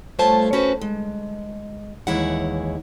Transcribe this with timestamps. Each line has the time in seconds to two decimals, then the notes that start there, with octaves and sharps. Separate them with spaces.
0.19 G2 A3 F4 C5 C#5 A5
0.53 C#4 F#4 B4 C5
0.81 G#3
2.07 D#2 E3 G#3 E4 C#5 F#5